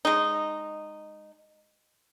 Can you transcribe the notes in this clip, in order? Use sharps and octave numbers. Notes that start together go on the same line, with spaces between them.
G#3 D#4